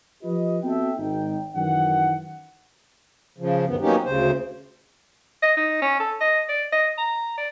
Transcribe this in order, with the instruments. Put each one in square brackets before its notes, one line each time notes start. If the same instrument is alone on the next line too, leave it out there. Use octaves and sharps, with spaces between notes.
[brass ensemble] F3 F4 G4 B4 D#5
B3 C4 F#4 A4 E5 G5
G#1 D#4 G5
F#2 D#3 E3 F#5
[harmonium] C#3 F3
D2 G2 D#3 B3
F#3 A#3 B3 C#4 D#4 G4
D2 C#3 C5
[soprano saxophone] D#5
D#4
C#4
A4
D#5
D5
D#5
A#5
D5